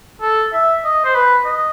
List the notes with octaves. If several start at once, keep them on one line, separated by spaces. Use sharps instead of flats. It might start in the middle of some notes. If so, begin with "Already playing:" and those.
A4
E5
D#5
C5
B4
D#5